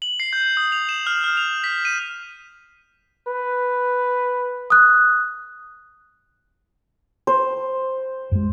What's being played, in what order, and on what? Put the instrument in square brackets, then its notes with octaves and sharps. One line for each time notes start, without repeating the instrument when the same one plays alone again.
[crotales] F#7
C7
G6
D#6
F7
E7
F6
F6
F7
B6
D#7
[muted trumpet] B4
[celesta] D#6 F#6
[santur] C5
[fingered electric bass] F#2 G#3